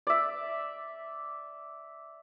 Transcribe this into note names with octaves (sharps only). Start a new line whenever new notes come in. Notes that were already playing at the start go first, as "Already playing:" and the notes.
D5 E5